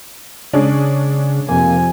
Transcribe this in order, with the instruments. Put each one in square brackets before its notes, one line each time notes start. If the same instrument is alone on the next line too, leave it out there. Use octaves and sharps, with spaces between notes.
[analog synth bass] C#3 [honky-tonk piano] G#3 C#4 D4
[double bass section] F2 C3 F3 [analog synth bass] A#3 [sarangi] G#5